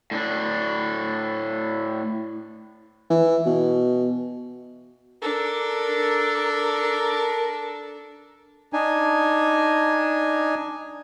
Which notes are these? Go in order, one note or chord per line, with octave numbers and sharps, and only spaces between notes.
A2 D4
E3
B2
D4 A4 A#4
D4 D#4 G#5